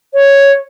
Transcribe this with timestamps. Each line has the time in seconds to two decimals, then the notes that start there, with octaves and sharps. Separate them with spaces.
0.14 C#5